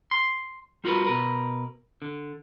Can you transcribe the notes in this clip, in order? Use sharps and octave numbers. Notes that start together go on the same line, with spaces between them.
C6
G3 F4 F#4 A#4 B4
B2 A#4 B4
D3